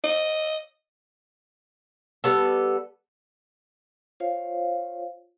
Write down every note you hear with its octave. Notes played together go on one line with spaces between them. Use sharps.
D#5
G3 B3 A4
F4 C5 C#5 F5